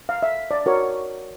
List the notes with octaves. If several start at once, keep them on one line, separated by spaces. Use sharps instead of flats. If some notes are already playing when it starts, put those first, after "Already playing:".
F5
E5
D5
F#4 A#4 C#5